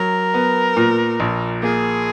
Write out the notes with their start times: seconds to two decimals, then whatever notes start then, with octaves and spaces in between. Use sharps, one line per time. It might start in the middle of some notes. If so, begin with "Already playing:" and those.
Already playing: F#3 A#4
0.34 B3
0.77 A#2
1.20 A#1
1.63 A#3 G#4